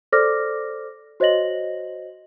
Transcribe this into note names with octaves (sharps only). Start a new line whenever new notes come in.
A4 C5 D5 D6 F6 A#6
F#4 C5 C#5 D#5 A#6 F#7